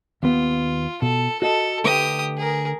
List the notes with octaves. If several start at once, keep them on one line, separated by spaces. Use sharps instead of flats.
D#2 B3 F4
B2 A4
F#4 A4 D#5
D3 A3 G4 B4 D#6
G#4 A#4